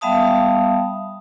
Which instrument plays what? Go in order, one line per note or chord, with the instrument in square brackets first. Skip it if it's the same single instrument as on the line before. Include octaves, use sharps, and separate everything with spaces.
[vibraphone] G3 B3 E5 F5 A5 D#6